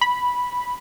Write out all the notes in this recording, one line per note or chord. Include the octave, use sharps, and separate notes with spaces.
B5